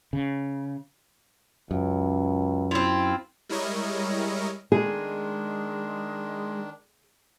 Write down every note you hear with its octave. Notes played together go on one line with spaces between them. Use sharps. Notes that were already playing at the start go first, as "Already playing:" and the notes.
C#3
C#2 F#2
C4 E4 F4
G3 G#3 E4 A#4 C#5 D#5
D#3 G#3 D4 G#4